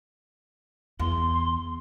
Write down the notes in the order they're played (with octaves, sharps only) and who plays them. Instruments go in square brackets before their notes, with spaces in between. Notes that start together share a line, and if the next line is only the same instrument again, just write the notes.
[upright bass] E2 [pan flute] C6